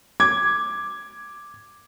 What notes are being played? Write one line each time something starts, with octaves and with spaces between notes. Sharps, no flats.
D6 G#6